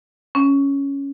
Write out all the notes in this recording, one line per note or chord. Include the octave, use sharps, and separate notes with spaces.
C#4